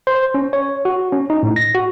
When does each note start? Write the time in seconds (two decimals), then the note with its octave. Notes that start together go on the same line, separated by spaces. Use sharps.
0.07 C5
0.34 C#4
0.53 C#5
0.85 F#4
1.12 C#4
1.30 D#4
1.43 A2
1.56 A#6
1.75 F#4